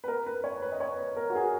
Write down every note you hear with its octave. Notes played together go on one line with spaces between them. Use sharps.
B4
A#4
B4
C#5
B4
D#5
C#5
B4
A#4
F#4
G#4